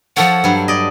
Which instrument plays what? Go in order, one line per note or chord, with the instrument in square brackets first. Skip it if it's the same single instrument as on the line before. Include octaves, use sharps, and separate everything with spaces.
[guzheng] F3 A4 C#5 [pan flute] F#5
[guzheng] G2 F#3
D5 D#5